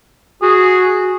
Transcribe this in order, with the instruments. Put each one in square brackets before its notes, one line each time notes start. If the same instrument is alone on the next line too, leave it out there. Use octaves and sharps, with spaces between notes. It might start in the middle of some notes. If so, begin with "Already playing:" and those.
[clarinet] F#4 [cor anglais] G#4